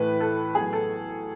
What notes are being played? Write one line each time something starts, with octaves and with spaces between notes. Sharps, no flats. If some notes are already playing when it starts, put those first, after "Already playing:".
Already playing: A2 E3 A3 B4
A4
A2 F#3 B3 G#4
A4